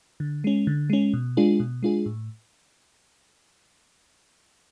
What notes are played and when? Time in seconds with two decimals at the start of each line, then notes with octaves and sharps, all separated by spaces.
0.20 D3
0.44 G#3 C#4
0.67 D3
0.90 G#3 C#4
1.13 B2
1.37 G#3 D4 F4 G#4
1.60 B2
1.83 G#3 D4 F4 G#4
2.06 A2